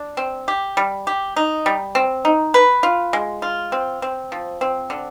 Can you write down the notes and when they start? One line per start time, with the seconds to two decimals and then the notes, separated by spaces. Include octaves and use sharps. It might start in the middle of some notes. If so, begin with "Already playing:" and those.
Already playing: D4
0.17 C4
0.48 G4
0.77 G3
1.07 G4
1.36 D#4
1.66 G3
1.95 C4
2.25 D#4
2.54 B4
2.83 F4
3.13 G#3
3.42 F4
3.72 C4
4.02 C4
4.32 F3
4.61 C4
4.90 D3